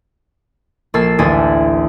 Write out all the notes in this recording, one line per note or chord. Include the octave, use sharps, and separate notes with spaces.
A#1 A#3 A4 A5 E6 C7
A1 D2 G#4 G#5 A5